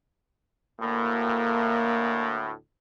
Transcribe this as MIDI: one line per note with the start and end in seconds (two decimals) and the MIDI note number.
0.80 2.52 38
0.80 2.52 45
0.80 2.48 58